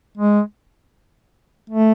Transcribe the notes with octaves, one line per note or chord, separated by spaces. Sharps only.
G#3
A3